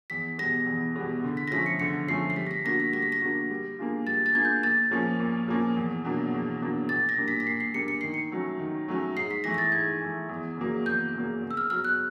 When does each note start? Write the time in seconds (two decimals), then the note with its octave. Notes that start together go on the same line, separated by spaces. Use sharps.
0.10 E2 B6
0.38 B2 G3 B3 A#6
0.67 E2
0.95 B2 G3 B3
1.24 D3
1.37 B6
1.48 A#6
1.51 F3 A3 C#4 B6
1.66 C#7
1.80 D3 C#7
2.08 F3 A3 C#4 C7
2.30 C7
2.36 G3 B6
2.47 A#6
2.51 B6
2.64 A#3 D4 F#4 A#6
2.80 B6
2.93 G3 A#6
3.02 B6
3.12 A#6
3.21 A#3 D4 F#4
3.50 G3
3.79 A#3 D4 F4 G#4
4.07 G3 A6
4.26 A6
4.35 A#3 D4 F4 G#4 G#6
4.45 G6
4.63 A#2 A6
4.91 F3 A#3 C#4
5.20 A#2
5.48 F3 A#3 C#4
5.77 E2
6.04 B2 F#3 A#3 D4
6.34 E2
6.62 B2 F#3 A#3 D4
6.89 A#2 A6
7.09 A#6
7.18 G3 A#3 D4
7.28 B6
7.40 B6
7.46 A#2 C7
7.60 C7
7.74 G3 A#3 D4 C#7
7.88 C#7
8.01 D#3 C7
8.14 C#7
8.32 F#3 A3 C#4
8.59 D#3
8.88 F#3 A3 C#4
9.16 G#2 C7
9.31 B6
9.44 E3 A3 A#6
9.54 A#6
9.58 A6
9.72 G#2 G#6
10.00 E3 A3
10.29 E2
10.57 C#3 F#3 A#3
10.85 E2 G6
11.14 C#3 F#3 A#3
11.42 C#3
11.51 E6
11.57 F6
11.70 F#3 B3 F6
11.84 F#6